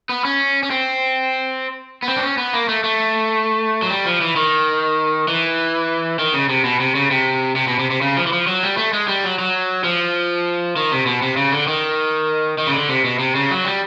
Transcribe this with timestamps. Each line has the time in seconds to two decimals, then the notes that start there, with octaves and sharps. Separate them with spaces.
0.09 B3
0.25 C#4
0.63 C#4
0.71 C4
2.03 B3
2.08 C4
2.16 D4
2.23 C#4
2.38 B3
2.53 A#3
2.69 A3
2.84 A3
3.82 F#3
3.90 G3
4.06 F3
4.21 E3
4.36 D#3
5.28 E3
6.19 D#3
6.34 C#3
6.49 C3
6.64 B2
6.80 C3
6.95 C#3
7.11 C3
7.56 C3
7.67 B2
7.79 C3
7.91 C3
8.01 C#3
8.17 F3
8.27 E3
8.32 F3
8.47 F#3
8.63 G3
8.77 A3
8.93 G#3
9.08 G3
9.24 F#3
9.39 F#3
9.84 F3
10.76 D#3
10.91 C3
11.06 B2
11.22 C3
11.37 C#3
11.52 D3
11.67 D#3
12.58 D#3
12.67 C#3
12.73 D3
12.89 C3
13.05 B2
13.19 C3
13.35 C#3
13.51 F#3
13.65 G3